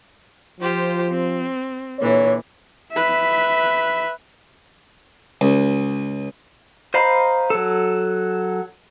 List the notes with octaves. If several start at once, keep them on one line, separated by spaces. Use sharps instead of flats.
F3 F4 G4 C5
C4
A#2 D3 E3 C#5
B4 E5
C#2
C5 D#5 F5 A#5 B5
F#3 A4